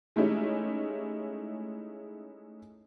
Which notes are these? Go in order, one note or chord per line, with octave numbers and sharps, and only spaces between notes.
G#3 A3 C#4 D#4 E4 G4